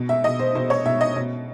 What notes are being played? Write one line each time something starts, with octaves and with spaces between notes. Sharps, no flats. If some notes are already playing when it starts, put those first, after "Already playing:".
Already playing: B2
E5
B2 D#5
C5
B2 C5
C#5
B2 E5
D#5
B2